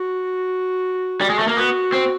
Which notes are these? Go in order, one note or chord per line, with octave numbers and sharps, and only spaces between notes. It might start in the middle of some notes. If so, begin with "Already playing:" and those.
Already playing: F#4
G3
G#3
A3
A#3
B3 F#4
C4